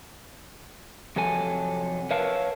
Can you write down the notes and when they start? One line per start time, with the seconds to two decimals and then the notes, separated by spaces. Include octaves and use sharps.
1.16 F2 C3 F#3 A4 G#5
2.11 A#4 B4 C#5 E5 F5 A5